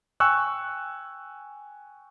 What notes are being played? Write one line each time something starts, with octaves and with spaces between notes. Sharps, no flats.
G5 G#5 C#6 E6 F#6